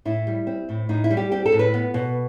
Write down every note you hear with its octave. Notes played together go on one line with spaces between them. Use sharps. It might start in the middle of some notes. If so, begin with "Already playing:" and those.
A2 E4
G3
C4
A2
A2 D#4
E4
G3
G4
C4 G4
A4
A2
B4
B3
B2